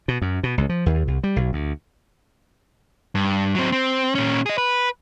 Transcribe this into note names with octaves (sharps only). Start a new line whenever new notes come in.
B2
F#2
B2
C#2
F3
D#2
C2
G3
B1
D2
G2
F#3 C4
C4
A#2 C#4
G#4 D#5
B4